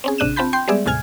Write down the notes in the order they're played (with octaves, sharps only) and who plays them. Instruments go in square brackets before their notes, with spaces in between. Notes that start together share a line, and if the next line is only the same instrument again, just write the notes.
[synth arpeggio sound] C4 C#4 G#4
A1 C3 D4 F#6 D#7 E7
C4 F4 A5 B5 G6
G5 C6 G6
G3 G#3 B3 G#4 D5 E5
D#2 A2 C3 G#5 F6 G#6